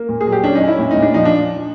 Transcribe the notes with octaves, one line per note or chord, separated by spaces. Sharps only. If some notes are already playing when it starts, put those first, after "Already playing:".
Already playing: A#3
A#2
G#4
F#3
G4
C#4 D4
D#4
C#4
E4
A#2
D#4
A#2
D4
F3 D#4
D4